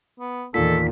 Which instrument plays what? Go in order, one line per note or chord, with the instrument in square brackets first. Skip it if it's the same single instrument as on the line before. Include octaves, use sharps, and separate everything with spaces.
[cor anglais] B3
[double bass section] E2 D#3 [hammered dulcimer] A#2 [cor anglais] A4 [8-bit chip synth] B6